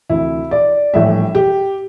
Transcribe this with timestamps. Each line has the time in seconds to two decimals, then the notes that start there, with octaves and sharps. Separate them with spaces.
0.10 D2 C3 E3 E4
0.51 D5
0.94 A#1 A2 E3 G3 E5
1.35 G4